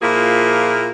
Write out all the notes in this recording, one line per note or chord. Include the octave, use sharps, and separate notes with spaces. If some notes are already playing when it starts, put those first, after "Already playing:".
A#2 F3 A#3 E4 F4 G#4